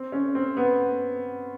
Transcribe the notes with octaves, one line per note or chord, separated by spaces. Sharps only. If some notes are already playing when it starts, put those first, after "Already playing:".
Already playing: C4
C#4
C4
B3